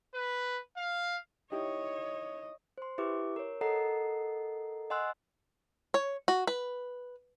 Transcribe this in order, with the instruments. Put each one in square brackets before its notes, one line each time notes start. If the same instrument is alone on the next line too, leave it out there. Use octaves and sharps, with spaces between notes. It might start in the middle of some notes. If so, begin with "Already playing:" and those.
[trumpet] B4
F5
[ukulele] D#4 E4 G4 [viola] C#5 [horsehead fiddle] D#5
[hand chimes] C5 C6
E4 G4 B4 E5 D6
A#4 C#5
A4 A#4 D#5 F#5 A#5 C7
D#5 F#5 G#5 C6 E6 F#6
[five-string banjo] C#5
F#4
B4